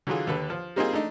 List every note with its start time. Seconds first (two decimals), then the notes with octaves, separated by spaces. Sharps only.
0.07 D3 E3 F#3 F4 G#4
0.27 D#2 D3 A4 B4
0.50 F3
0.76 G3 A#3 C4 D#4 F4 G#4
0.93 A3 D4 D#4